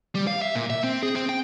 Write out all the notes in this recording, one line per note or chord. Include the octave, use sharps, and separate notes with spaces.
G3
F5
E5
A#2
E5
C4
G#4
C4
G5